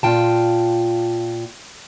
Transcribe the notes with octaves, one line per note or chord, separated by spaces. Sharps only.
A#2 F4 G5 A5